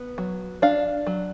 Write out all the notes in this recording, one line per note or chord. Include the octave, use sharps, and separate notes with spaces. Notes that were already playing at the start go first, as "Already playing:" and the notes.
Already playing: B3
F#3
D4 F5
F#3